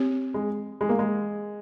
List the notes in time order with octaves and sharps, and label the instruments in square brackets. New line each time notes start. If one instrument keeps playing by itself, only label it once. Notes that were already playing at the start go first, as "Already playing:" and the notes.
Already playing: [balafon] C4 G4 C#5
[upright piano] G#3
G#3
A#3
G#3